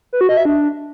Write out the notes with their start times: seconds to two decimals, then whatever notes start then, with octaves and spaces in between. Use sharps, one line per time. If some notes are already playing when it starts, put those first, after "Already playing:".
0.13 B4
0.21 F#4
0.29 D#5
0.37 E5
0.45 D4